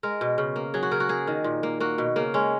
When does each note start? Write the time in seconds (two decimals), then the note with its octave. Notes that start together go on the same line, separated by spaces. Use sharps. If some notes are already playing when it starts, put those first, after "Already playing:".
0.03 G#3 A#4
0.21 B2
0.38 C#3
0.56 A#3
0.74 F#3 G#4
0.83 F#4
0.91 C#3 A#4
1.00 F#4
1.09 A#3 G#4
1.27 D#3
1.44 A#2
1.63 A#3
1.80 A#3 F#4
1.98 B2
2.16 C#3 A#3
2.34 G#3 C#4